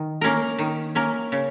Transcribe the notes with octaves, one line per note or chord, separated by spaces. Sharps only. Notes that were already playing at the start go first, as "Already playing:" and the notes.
Already playing: D#3
A#3 C#4 A#4
D#3
A#3 C#4 A#4
C#3